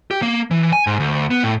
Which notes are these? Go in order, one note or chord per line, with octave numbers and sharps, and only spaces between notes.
G4
A#3
E3
G#5
G#2
D2
B3
A2